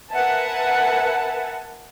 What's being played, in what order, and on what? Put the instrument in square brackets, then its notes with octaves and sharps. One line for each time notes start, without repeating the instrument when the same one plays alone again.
[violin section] A#4 B4 E5 F#5 G#5 A5